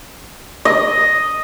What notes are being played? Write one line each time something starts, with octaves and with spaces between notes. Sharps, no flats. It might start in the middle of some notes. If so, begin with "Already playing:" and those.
D#5